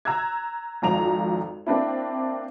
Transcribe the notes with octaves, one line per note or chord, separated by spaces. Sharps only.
A#5 E6 F#6 G#6
G#1 F2 A#5 F7
A#3 C4 D4 E4